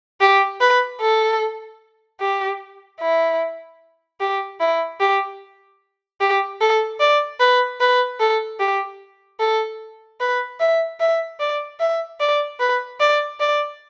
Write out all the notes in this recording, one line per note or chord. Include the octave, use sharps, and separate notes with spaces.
G4
B4
A4
G4
E4
G4
E4
G4
G4
A4
D5
B4
B4
A4
G4
A4
B4
E5
E5
D5
E5
D5
B4
D5
D5